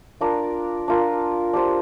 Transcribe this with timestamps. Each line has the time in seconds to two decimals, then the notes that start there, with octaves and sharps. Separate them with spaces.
0.21 D4 F4 A#4
0.88 D4 F4 A#4
1.53 D4 G4 C5